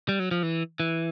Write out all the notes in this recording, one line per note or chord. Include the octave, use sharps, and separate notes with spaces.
G3
F#3
F3
E3
E3